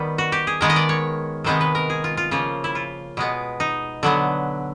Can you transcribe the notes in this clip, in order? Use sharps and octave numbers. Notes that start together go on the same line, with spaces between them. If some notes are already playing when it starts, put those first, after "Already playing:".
Already playing: D#3 G3 B3
F#4
G4
G#4
D#3 G#3 B3 A#4
D#5
D5
C#5
C3 D#3 G#3 B3 C5
B4
A#4
G#4
F4
F4
C#3 F3 A#3 F4
E4
F4
B2 G#3 B3
D#4
D3 F#3 B3